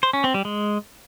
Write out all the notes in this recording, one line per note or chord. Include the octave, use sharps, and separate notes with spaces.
C5
C#4
C4
G3
G#3